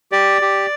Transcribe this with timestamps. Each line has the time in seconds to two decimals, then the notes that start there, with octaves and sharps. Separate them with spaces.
0.12 G4 D5
0.42 G4